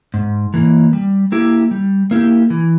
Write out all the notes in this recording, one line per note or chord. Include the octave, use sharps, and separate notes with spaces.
G#2
E3 A#3
G3
A#3 E4 G4
G3
A#3 E4 G4
E3